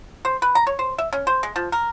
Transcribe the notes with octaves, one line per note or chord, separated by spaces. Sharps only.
C5
B4
A#5
C#5
C5
E5
C#4
C5
G#3
F3
A#4